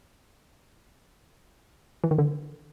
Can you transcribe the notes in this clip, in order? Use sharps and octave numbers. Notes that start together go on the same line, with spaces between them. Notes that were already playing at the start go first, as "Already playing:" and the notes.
E3
D#3
D3